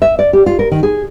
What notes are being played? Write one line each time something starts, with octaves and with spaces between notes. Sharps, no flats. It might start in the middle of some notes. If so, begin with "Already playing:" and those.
E5
D5
G4
F4
A#4
D#3
G#4